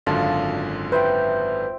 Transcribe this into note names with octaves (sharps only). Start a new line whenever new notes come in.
G#1 F#2 D3 F4 A5
B4 C5 E5 G5